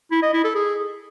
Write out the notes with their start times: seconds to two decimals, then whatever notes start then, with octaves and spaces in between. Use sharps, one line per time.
0.11 E4
0.22 D#5
0.33 E4
0.44 A4
0.55 G#4